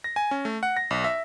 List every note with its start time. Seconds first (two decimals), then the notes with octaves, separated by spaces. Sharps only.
0.04 A#6
0.16 G#5
0.31 C#4
0.45 A3
0.63 F#5
0.77 A#6
0.91 B1
1.04 E5